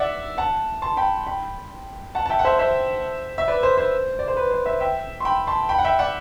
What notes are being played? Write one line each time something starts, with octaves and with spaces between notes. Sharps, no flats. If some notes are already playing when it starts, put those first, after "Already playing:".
Already playing: D5 E5 F#5
F#5 A5
A5 C6
G5 B5
G5 B5
F#5 A5
A5
E5 G5
F#5
C5 E5
C5 E5
E5
B4 D5
C5
C5
D5
C5
B4
C5
C5 E5
E5 G5
C6
G5 B5
A5 C6
G5 B5
F#5
E5 G5
D5 F#5